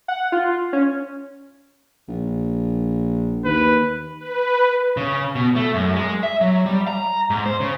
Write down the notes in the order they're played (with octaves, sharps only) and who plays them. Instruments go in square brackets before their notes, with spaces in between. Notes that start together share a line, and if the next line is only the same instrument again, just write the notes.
[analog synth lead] F#5
F4
C#4
[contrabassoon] A#1
[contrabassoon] D#2 [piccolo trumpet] B4
[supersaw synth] B4
[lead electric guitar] C#3
B2
A3
F#2
G#3
E5
F#3
G3
A#5
G#2
C5
C#3